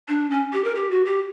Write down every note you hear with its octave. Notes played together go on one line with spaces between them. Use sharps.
D4
C#4
G4
A#4
G4
F#4
G4